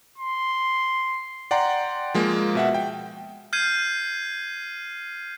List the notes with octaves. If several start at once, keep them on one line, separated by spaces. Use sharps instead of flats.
C6
D5 F#5 G5 A#5 C6
F3 G#3 A#3
B2 E5 F#5
G5
F6 G6 G#6 C7 D#7